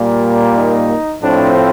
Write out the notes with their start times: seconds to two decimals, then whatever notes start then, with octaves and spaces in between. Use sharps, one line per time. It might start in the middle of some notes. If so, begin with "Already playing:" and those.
Already playing: A#2 G3 A#3
0.56 D#4
1.22 A2 F3 A3 C4 D4